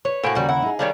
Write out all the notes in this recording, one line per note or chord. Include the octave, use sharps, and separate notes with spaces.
B4 C#5
A2 A#3 F#4 C5 G5 G#5
D#2 C#3 G3 F#4 A#4
E4 F#5
D#4 G#4
D#3 G3 D4 G4 C#5 F5